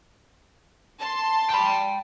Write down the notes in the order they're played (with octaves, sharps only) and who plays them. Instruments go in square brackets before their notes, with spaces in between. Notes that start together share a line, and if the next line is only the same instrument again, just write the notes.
[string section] A5 C6
[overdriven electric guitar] G5 B5